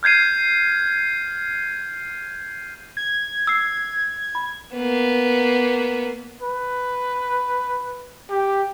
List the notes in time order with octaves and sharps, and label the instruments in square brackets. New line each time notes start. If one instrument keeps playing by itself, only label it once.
[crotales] F6 G6 G#6 C7 D#7
[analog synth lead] G#6
[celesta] E6 C7
B5
[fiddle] A#3 B3
[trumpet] B4
G4